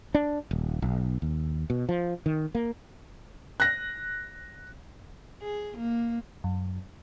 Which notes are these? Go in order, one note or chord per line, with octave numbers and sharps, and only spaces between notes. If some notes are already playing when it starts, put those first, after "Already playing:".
D4
D#1
B1
D#2
B2
F3
D#3
A#3
F#6 A#6
G#4
A#3
F#2